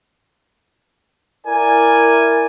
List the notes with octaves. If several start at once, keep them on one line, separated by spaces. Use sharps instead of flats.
E4 A#4 D5 G#5